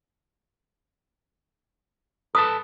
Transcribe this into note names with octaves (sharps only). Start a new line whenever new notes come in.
A4 B4 A5 D#6